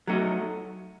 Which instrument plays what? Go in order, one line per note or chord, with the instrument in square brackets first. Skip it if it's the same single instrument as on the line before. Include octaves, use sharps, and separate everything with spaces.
[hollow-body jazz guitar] F#3 A3 D#4 F#4